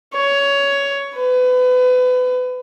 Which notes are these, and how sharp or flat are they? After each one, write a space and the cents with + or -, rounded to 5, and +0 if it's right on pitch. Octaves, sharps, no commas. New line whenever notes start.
C#5 +15
B4 +30